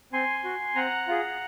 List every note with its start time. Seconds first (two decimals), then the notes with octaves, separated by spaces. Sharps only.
0.13 C4 G#5 C6
0.44 F#4
0.76 C4 F#5 A#5
1.08 F4 G#4